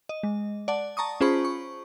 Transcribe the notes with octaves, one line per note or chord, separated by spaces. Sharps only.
D#5
G#3
D5 F#5 A5
A5 A#5 C#6 D#6
C#4 F4 G#4 C5 B5 C#6
C#6